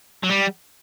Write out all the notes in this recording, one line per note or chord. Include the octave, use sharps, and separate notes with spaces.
F#3
G3